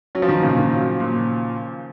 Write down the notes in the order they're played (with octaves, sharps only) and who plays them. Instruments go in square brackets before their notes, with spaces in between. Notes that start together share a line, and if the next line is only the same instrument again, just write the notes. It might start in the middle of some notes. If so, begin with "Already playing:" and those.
[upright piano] F#3 [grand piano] C#4
[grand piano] F3
D#3
[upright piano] A#2 [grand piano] C#3
[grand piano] D#3
[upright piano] F#3
A#2